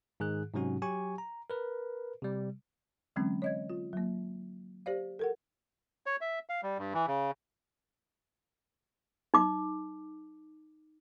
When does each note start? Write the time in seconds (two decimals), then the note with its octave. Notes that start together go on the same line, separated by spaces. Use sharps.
0.20 G#2 D#3 G#4 F#6
0.54 G#2 C3 F#3 C#4 F#4
0.82 F#3 G4 G#5 C#6
1.18 A#5
1.50 A#4 B4
2.22 C3 G3
3.16 D3 E3 F#3 G#3 C4 C#4
3.42 C#5 D#5 G#6
3.70 F4
3.93 F#3 A#3
4.86 G4 C5 D5 F5
5.19 A4 A#4 F#5
6.06 C#5
6.21 E5
6.49 F5
6.63 G3
6.78 G2
6.94 E3
7.07 C#3
9.34 D#4 D6